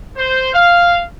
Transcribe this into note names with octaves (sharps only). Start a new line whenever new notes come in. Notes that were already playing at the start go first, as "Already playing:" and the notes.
C5
F5